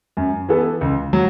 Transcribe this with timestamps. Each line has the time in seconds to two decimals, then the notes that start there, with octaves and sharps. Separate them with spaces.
0.17 F#2
0.49 E3 B3 A4
0.81 C#2
1.13 F#3